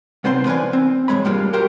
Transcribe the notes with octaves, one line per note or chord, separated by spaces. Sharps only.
C2 B3 C4 C5 F#5 C6
E3 F3 B4 D5 G#5
C4
E2 G2 B2 G#3 C#5 B5
G2 G3 G#3 A#3 F4
F#4 G4 A#4 C5 F5 G5